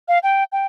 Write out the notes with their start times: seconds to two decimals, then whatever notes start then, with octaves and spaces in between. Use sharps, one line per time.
0.08 F5
0.23 G5
0.52 G5